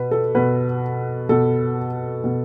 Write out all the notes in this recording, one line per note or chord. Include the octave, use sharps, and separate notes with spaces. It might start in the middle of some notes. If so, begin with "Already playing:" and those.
Already playing: B2 B4
A4
B2 B4
B2 A4
B2